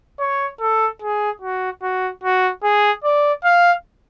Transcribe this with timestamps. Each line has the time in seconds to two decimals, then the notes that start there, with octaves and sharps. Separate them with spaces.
0.20 C#5
0.61 A4
1.02 G#4
1.42 F#4
1.83 F#4
2.23 F#4
2.63 G#4
3.04 D5
3.44 F5